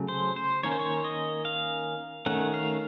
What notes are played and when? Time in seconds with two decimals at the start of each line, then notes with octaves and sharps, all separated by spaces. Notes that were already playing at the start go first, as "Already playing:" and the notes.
Already playing: C#3 F#3 A3 C#4
0.08 C5
0.36 C5
0.63 D#3 A#3 C#4 C#5
0.72 C5
0.80 C#5
1.04 D#5
1.45 F5
2.26 D#3 A3 C#4 F#5
2.54 F5